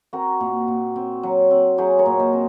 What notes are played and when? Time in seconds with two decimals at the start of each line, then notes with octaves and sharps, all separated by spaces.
0.13 C4 F#4 A#4
0.40 A#2
0.68 A#2
0.96 C4
1.23 F#3
1.51 C4
1.78 F#3 G#4 C5
1.99 A#4 C#5
2.06 A#2
2.20 C5 D#5
2.33 C4